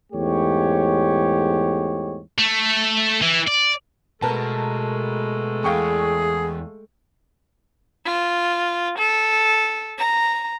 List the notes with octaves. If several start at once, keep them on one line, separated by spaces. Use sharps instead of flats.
E2 G#2 A3 G4 C#5
A3
E3
D5
B2 G#3 A3 A#4 B4 A5
E2 G#4 F5 G5 C#6
F4
A4
A#5